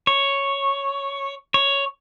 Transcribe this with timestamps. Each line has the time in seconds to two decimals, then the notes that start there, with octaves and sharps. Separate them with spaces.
0.07 C#5
1.54 C#5